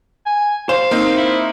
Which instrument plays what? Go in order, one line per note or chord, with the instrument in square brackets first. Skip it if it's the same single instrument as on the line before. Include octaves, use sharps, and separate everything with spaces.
[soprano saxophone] G#5
[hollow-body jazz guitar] C5 [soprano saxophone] F5 [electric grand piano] E7
[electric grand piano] A#3 C4 D#4
[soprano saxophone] E4